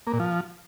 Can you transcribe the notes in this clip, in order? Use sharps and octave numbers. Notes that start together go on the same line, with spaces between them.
A#3
A#2
F3